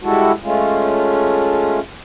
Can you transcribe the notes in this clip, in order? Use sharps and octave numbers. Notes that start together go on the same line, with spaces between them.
G3 G#3 E4 F#4 A4
G#3 A3 C#4 F4